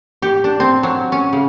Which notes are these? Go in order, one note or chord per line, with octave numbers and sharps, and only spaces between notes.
G4
D4
C4
F#3
C#4
C#3